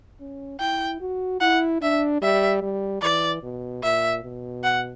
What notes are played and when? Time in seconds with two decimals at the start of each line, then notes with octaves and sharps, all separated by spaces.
0.20 C#4
0.60 E4 G5
1.01 F#4
1.40 E4 F#5
1.81 D4 E5
2.22 G3 E5
2.62 G3
3.02 E3 D5
3.43 B2
3.83 A#2 E5
4.24 B2
4.63 F#5